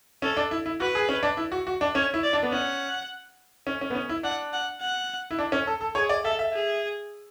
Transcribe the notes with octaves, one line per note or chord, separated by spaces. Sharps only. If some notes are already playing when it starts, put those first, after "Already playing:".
C#4 A4
D4
E4
E4
F#4 B4
G#4
C#4
D4
E4
F#4
F#4
D4
C#4 C#5
E4
D5
D4
B3
C#4 F#5
C#4
C#4
B3
C#4
E4
D4 F#5
F#5
F#5
E4
D4
C#4
A4
A4
G#4 C#5
D5
A4 E5
E5
G#4